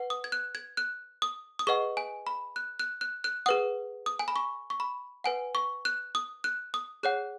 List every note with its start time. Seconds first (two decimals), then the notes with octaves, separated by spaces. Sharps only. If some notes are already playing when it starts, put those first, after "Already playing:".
Already playing: B4 F#5
0.10 D#6
0.24 G#6
0.32 F#6
0.55 G#6
0.77 F#6
1.22 D#6
1.59 D#6
1.67 G#4 B4 D#5 F#5 C#6
1.97 G#5
2.27 B5
2.56 F#6
2.80 F#6
3.01 F#6
3.24 F#6
3.46 G#4 B4 F#5 D#6
4.06 D#6
4.19 G#5
4.28 B5
4.36 C#6
4.70 C#6
4.80 B5
5.24 B4 F#5 G#5
5.55 C#6
5.85 F#6
6.15 D#6
6.44 F#6
6.74 D#6
7.03 G#4 C#5 F#5 F#6